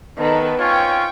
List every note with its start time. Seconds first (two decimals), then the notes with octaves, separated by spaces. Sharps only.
0.18 D#3 B3 A4 B4
0.60 C4 C#4 F4 C#5 G5 C#6